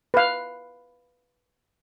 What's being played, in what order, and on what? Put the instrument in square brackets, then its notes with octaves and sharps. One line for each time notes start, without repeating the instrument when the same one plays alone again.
[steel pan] B4 F5